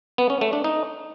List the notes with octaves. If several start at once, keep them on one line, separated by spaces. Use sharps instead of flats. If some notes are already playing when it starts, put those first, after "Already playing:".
B3
C#4
A3
D4
D#4